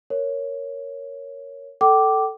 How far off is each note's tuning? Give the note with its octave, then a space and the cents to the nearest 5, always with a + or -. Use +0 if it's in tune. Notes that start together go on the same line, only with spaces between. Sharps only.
A#4 +0 C#5 +0
A4 +0 G5 -35 D6 +0